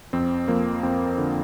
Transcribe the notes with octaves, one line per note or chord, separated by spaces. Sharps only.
F2 C4
F3 A#3
F2 C4
D3